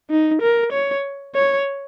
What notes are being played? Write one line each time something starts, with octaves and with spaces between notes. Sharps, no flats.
D#4
A#4
C#5
C#5